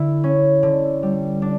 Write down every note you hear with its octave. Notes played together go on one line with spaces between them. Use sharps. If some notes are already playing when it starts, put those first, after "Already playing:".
Already playing: D3 E4
C#4
D3
G3
D4